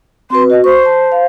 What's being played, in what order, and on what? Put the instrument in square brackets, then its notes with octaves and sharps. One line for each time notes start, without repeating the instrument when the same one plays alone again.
[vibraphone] C4 F#4 B4 [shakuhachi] C6
[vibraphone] F#4 [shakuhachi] D#5
[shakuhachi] C5 [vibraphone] C#6
[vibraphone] A5
F5